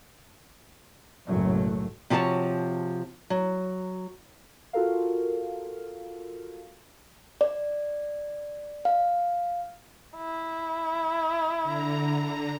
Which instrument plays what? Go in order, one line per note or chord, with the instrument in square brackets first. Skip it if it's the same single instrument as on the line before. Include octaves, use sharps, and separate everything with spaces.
[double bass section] F#1 B1 F#2 A2 F#3 A3
[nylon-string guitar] C3 F3 F#4 B4 C#5 A5
F#3
[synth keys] F4 F#4 A4 A#4 F5
[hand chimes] D5
F5
[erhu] E4
[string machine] D3 A#5